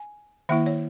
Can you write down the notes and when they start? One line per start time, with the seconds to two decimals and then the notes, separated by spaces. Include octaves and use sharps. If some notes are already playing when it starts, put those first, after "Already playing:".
Already playing: G#5
0.49 D#3 A#3 E4 E5
0.66 C#5